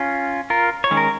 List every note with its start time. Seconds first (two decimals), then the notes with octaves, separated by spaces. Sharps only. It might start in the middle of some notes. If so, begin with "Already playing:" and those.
Already playing: C#4 F4
0.50 F4 A#4
0.84 C#5
0.91 D#3 G#3 C#4
0.97 A#4